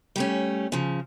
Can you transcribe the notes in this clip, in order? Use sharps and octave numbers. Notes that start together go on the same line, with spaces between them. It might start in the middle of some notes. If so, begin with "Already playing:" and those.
G3 A3 C#4
C#3 F3